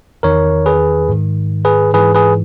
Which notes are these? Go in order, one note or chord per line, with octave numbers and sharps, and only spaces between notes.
E2 D#3 A#4 C#5
G#4 B4
G#2 D#3
G#4 B4
G#2 E3 G#4 B4
G#4 B4